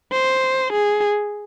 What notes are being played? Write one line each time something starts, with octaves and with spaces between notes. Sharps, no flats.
C5
G#4